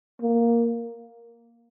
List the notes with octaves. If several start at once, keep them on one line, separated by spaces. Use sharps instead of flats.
A#3